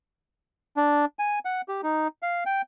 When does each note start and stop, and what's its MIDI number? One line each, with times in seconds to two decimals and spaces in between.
0.77 1.05 62
1.19 1.39 80
1.45 1.61 78
1.68 1.81 67
1.83 2.08 63
2.22 2.44 77
2.46 2.62 79